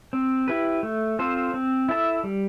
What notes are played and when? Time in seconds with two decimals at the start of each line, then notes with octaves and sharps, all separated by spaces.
0.13 C4
0.48 E4 G4 B4
0.83 A3
1.19 C4 F4 A4 C5
1.54 C4
1.89 E4 A4 E5
2.24 G3